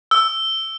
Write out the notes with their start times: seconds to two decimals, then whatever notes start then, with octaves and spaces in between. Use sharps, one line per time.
0.11 E6